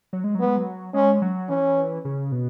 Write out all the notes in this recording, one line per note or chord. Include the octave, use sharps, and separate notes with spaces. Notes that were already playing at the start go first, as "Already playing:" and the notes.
F#3
G#3
F#3
B3
G#3
F#3
G#3 C#4
F#3
E3 C#4
C#3
B2